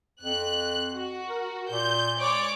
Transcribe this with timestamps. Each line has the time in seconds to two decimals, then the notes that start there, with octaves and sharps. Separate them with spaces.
0.22 F2 F#6
0.94 F#4
1.30 A#4
1.71 A#2 G6
2.18 G#3 C#5 D5 D6